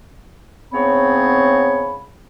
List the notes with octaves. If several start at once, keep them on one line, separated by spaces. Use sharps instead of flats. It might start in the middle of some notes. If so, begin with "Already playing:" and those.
G#2 C#3 B3 C4 C#5 B5